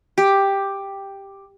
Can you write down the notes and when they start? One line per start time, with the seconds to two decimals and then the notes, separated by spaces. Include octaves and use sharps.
0.18 G4